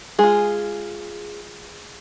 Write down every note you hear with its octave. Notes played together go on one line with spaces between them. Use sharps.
G#3 F4 G#4